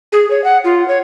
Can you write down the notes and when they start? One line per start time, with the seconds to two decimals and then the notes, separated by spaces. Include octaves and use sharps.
0.12 G#4
0.31 C#5
0.44 F#5
0.64 F4
0.88 C#5